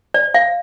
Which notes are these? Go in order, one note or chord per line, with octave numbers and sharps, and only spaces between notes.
D5
F5